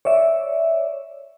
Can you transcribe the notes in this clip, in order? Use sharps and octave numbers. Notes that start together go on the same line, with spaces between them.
C#5 D5 E5